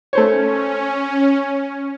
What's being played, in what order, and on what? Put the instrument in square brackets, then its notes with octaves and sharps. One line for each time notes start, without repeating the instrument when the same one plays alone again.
[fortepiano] A3 C5 C#5 [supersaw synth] C#4